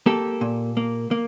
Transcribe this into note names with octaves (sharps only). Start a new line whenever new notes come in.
A#3 G4 A4
A#2
A#3
A#3